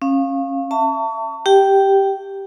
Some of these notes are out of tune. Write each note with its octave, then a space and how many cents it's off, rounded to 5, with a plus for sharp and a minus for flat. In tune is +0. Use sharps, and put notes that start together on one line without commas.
C#4 -30 F5 +0
E5 +15 A5 +35 C#6 +30
G4 +0 G5 -10